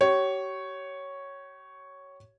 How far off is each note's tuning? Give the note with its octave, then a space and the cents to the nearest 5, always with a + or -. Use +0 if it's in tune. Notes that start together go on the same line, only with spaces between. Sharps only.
G4 -40 C#5 +0